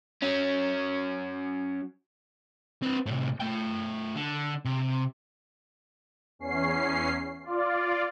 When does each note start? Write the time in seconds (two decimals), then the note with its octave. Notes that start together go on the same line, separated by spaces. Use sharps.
0.22 F#3 C#4
2.83 C4 B4
3.06 A2 C3
3.40 A3 G5
4.15 D3
4.65 C3
6.39 E2 C#4 C7
7.43 F4 D5